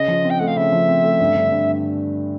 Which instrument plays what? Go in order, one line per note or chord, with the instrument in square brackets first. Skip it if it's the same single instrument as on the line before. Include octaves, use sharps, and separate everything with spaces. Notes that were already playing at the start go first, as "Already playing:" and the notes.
Already playing: [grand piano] C#3 [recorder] D#5
[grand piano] F3
C4
[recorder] G5
[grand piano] A3 [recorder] F#5
[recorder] F5
[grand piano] C#3 [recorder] E5
[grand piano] F3
C4
A3
G2
D3
G2